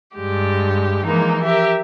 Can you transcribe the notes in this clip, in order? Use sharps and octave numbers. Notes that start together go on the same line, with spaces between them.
G2 G#3 G4
E3 F3 G#3 A#3 D#4
G4 A#4 E5